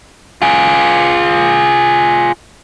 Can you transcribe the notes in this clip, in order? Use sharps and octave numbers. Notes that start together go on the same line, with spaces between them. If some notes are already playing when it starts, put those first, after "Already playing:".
F4 G#4